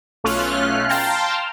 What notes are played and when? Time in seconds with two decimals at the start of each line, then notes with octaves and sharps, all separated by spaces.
0.24 B1 A3 C#4 F4 F6 F#6
0.89 F5 G5 A5 A#5 C6 F6